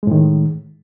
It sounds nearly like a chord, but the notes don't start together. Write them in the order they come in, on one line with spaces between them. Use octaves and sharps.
G#3 A2 D#3